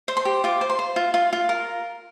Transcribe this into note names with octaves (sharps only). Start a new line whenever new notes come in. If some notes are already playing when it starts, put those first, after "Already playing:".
C5
C6
G4
F4 D6
C5
C6
C5
F4
F4
F4
A#4